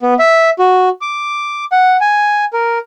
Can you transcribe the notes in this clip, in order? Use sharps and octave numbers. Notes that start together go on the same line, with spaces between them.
B3
E5
F#4
D6
F#5
G#5
A#4